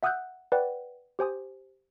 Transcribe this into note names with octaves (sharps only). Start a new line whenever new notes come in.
E5 F#5 D#6 E6 F#6 G6
B4 D5 F#5 G5
G4 C5 G#5 D#6